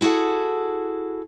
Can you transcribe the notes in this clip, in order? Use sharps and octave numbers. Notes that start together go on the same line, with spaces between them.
E4 F#4 G#4 A4 F#5